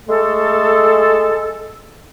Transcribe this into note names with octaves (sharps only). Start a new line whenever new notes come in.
G#3 A3 A4